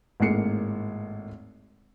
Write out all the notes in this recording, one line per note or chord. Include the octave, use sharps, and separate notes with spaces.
G#1 A2 G#3 A#3 C7 C#7